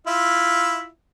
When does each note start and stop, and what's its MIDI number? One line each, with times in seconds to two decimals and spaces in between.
0.07 0.87 64
0.07 0.87 65
0.07 0.87 76